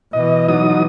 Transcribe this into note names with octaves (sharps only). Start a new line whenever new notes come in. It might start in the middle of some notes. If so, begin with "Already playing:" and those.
B2 E3 D#5
F#3 D#4 D#6